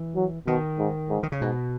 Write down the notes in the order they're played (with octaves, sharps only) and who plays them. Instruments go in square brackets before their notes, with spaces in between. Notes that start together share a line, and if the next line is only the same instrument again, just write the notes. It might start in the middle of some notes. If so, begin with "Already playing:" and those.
Already playing: [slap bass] E3
[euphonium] F#3
[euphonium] B2 [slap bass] D#3
[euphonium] G#2
G#2
[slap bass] D#3
C#3
[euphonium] G#2 [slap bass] B2